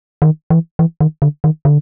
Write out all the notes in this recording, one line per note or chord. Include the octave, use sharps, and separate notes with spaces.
D#3
E3
E3
D#3
D3
D#3
D3